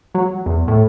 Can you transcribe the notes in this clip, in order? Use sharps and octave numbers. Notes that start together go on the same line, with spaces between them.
F#3
E2
A2